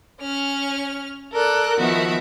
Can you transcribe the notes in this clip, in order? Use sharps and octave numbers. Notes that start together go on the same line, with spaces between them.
C#4 F6
A4 A#4 D5 F#6
D#3 F3 B3 F#4 E5